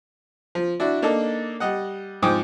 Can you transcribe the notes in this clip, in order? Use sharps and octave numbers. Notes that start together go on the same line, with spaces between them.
F3
D4 E4 F#4
A#3 D4 D#4 A4
G3 D#5 F#5
G#2 F3 G5 D6 D#6